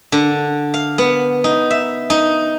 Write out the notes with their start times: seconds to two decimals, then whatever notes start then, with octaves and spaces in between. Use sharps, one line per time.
0.12 D3
0.74 F5
0.98 B3
1.44 D#4
1.71 E5
2.10 D#4